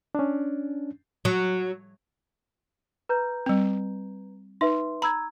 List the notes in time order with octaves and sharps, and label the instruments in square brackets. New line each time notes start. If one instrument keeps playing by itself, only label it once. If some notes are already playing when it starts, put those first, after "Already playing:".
[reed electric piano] C#4 D4
[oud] F#3
[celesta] B4 A#5 G6
[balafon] G3 C4
[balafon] D#4 [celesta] B4 E5 C6
[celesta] A#5 E6 G#6 [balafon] B5